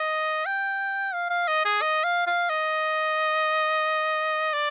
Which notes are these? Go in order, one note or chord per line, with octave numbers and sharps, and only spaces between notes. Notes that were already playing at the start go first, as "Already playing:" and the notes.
Already playing: D#5
G5
F5
F5
D#5
G#4
D#5
F5
F5
D#5
D5